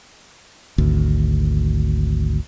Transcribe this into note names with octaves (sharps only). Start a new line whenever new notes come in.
G#1 D2